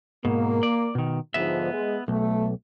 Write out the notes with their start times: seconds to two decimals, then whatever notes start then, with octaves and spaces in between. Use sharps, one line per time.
0.25 G#2 B2 A#3
0.63 D5
0.95 B2 D#3
1.34 G#2 D3 F3 B3 E5
1.73 G#3
2.08 B1 A3